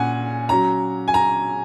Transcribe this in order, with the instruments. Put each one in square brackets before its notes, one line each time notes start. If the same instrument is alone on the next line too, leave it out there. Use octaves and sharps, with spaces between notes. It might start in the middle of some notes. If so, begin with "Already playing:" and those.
Already playing: [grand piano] A#2 C#4 F#5 G#5
F#3 C#4 A#5
G#5
A#5